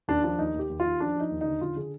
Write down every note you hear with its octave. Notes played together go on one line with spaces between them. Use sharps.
D#2 D4
F3 D4
D#2 D#4
D#2
G4
D#2
D#2 F4
F3 D4
F3 D#4
D#2
D3 D#4
D3 F4
D3 G#4